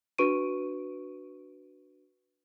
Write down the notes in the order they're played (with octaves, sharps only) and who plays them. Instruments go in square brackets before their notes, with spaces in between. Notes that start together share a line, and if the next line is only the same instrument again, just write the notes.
[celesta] D4 F#4 B4 C#6 D7 D#7